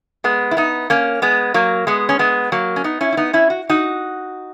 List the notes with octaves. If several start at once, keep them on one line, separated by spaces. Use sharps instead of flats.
G#3 B3
E4
B3 D#4
A#3 C#4
G#3 B3
F#3 A#3
G#3 B3
C#4
G#3 B3
F#3 A#3
C#4
B3 D#4
C#4 E4
E4
B3 D#4
C#4 E4
F#4
D#4 F#4